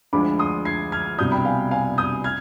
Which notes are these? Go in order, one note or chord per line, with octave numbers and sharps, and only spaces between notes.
D2 D3 F3 G#3 B5 D6
C6 D#6
G#6 C7
F6 G#6
C2 B2 G3 D#6 G6
G5 B5
F5 G#5
F5 G#5
D#6 G6
F6 G#6